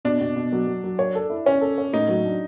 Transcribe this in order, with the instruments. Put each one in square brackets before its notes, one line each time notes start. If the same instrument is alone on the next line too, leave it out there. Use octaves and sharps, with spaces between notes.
[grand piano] B2 [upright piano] D4
[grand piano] B2
B2
F#3
F#3
F#3
C#5
A4
E4
[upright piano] C#4 [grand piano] C#5
[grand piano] A4
C#5
[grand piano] A2 [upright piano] D#4
[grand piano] F#3
D4